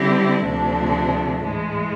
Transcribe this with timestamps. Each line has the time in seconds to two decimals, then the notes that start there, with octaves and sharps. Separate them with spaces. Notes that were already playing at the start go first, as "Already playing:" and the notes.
Already playing: D3 G3 C4 E4 G4
0.44 D2 C3 F3 A3 D4
1.42 A2 E3 G#3